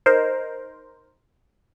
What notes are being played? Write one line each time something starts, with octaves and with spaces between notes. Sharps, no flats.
D#4 A#4 C5